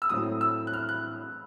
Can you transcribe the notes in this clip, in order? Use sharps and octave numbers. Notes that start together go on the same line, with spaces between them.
E6
A2 F#3 A3 C4 E4 D#6
E6
F#6
F6
F#6